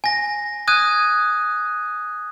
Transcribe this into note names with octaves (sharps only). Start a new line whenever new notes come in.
G#5 A#6
D#6 F#6 G#6 D#7